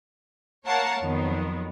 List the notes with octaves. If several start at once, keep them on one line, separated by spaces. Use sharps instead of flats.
A#3 A#4 C#5 F5 F#5 A5
F2 D#3 F3 F#3 B3